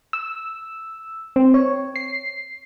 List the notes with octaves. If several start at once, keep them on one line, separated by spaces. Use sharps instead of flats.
E6
C4
C#5
C7